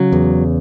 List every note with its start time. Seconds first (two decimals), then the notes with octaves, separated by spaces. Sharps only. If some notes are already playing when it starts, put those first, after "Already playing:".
Already playing: C#3 F#3
0.12 E2